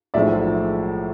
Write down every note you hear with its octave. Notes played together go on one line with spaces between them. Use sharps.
B1 A2 F3 G#3 D5 E5